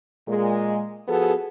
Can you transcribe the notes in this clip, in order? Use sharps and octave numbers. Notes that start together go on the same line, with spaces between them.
A#2 G#3
F3 B3 F#4 G#4 A4